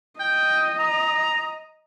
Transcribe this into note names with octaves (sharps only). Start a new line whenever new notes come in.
D#5 G5
A#5